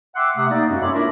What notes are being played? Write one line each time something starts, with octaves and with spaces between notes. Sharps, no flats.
E5 F#5 G5 C6 D6 E6
C3 A3 E5 F#5 D#6
A#3 D#4 D5
F#2 G#3 C4 C#4 F#4
A4 C#5 E5 B5 C6 D6
D4 E4 F4 A#4 E5